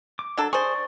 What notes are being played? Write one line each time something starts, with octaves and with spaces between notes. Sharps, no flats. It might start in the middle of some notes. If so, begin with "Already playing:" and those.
D6
F#3 D4 A4
G#4 C5 D5 C#6